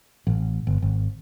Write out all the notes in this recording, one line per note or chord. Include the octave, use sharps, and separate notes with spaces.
A1
G1
G#1